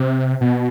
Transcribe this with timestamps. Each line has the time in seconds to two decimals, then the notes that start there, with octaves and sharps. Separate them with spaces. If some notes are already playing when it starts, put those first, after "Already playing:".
Already playing: C3
0.41 B2